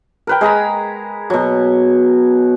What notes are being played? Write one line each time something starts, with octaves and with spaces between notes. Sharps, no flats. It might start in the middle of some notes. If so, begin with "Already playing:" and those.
A#4 B4 G5
G#3 G#4 A#5 B5
B2 F#3